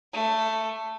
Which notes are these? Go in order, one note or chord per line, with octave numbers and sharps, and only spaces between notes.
A3